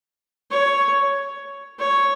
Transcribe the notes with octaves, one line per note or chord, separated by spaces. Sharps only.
C#5
C#5